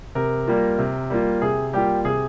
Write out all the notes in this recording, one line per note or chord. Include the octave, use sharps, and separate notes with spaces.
C3 A#4
G3 A#3 F4
C3
G3 A#3 F4
C3 G#4
G3 A#3 F4 G4
C3 G#4